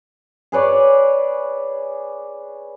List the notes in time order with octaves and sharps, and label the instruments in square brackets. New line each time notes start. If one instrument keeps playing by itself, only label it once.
[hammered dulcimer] G#4 B4 C#5 D5